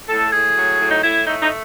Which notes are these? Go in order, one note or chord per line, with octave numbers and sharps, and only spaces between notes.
A2 A4
A2 G#4
F#3
A2
D#4
A2 E4
A3 D#4
D#4